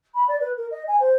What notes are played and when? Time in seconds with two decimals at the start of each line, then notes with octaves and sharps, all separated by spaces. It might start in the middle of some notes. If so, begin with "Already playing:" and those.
0.14 B5
0.28 D5
0.40 B4
0.56 A#4
0.71 D#5
0.88 G#5
1.00 C5